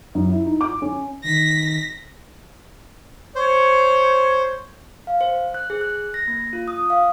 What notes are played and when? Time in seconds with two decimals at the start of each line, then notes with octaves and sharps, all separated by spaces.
0.15 F#2
0.30 E4
0.46 D#4
0.61 D6
0.82 C#4
1.24 D#3 A#6 B6
3.36 C5 C#5
5.07 F5
5.21 C5
5.54 F#6
5.70 G#4
5.81 F#6
6.14 A#6
6.28 A#3
6.53 F4
6.68 D#6
6.90 F5